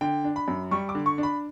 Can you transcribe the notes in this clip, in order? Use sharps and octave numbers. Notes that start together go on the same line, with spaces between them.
D3 G5
D4
B5
F#2
G3 C#6
D6
D3
C#6
D4
B5